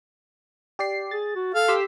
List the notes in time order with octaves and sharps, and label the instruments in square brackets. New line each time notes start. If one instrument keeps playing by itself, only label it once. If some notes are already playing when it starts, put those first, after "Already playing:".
[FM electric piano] G4 D5 C7
[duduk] G#4 [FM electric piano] A6
[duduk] F#4
[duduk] A4 [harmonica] F5
[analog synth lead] G4 [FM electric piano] C6 E6 B6